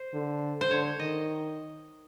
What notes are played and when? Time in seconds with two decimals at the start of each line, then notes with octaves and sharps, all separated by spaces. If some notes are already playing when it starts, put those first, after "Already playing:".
Already playing: C5
0.14 D3
0.61 C5
0.70 D3 C#5
0.99 D#3 D#5